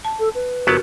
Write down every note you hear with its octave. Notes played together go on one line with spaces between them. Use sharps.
A5
A4
B4
G1 F#3 B3 F#4 G4 A#4